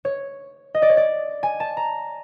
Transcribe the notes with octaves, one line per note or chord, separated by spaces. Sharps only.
C#5
D#5
D5
C#5
D5
G#5
A5
A#5